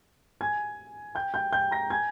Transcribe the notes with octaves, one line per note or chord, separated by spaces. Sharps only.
G#5 G#6
G5 G6
G5 G6
G5 G6
A#5 A#6
G#5 G#6